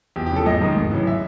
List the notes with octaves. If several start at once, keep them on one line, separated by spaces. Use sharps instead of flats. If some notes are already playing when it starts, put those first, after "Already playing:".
E2 G4
G4
C#3 F3 A4
G#1 D#5
G#2 D#3
G#1
F#2 C#3 E3
E5